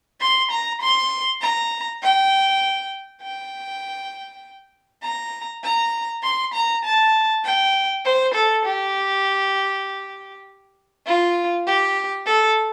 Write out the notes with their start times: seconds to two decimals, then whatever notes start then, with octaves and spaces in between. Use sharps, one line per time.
0.21 C6
0.51 A#5
0.80 C6
1.41 A#5
2.01 G5
3.22 G5
5.03 A#5
5.63 A#5
6.23 C6
6.53 A#5
6.84 A5
7.44 G5
8.05 C5
8.34 A4
8.64 G4
11.06 F4
11.66 G4
12.25 A4